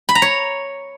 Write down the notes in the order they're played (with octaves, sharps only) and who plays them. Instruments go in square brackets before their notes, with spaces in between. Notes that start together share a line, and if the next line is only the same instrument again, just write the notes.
[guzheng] B5
A#5
C#5